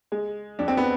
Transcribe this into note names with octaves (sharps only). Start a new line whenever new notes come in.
G#3
F2 D4
C4
B3